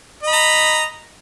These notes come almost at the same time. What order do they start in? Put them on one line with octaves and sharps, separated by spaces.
D#5 B5 A#5